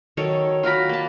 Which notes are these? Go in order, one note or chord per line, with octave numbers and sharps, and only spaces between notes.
D#3 F#3 A4 C#5
F4 F#4 A#4 B5
A#3 A5